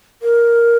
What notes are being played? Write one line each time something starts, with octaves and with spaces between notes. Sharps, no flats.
A#4